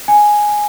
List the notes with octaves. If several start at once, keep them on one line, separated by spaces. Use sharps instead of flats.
G#5